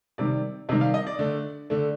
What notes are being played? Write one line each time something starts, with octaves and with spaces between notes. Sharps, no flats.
C3 D#3 G3 D5
C3 D#3 G3 D#5
F5
D#5
D5
D3 A3 D4
D3 A3 D4